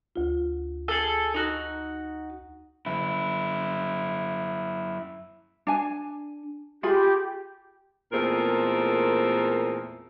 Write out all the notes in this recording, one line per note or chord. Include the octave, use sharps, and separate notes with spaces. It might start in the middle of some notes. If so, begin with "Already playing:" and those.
D2 F4
G#4 A4
D#4 F#4
F#2 E4
D4 G#5
F4 G4 G#4 B5
E2 A#2 A3 C4 G#4 A#4